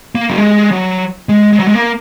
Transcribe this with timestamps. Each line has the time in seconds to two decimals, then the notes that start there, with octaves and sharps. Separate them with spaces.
0.15 A#3
0.30 F#3
0.38 G#3
0.72 F#3
1.29 G#3
1.52 G#3
1.60 F#3
1.67 G#3
1.75 A#3